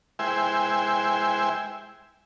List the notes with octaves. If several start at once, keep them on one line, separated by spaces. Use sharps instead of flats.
G#3 E4 C5 E5 G5 G#5